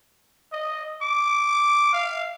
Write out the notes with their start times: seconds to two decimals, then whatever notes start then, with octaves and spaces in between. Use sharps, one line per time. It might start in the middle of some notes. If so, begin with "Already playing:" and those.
0.52 D#5
1.02 D6
1.93 F5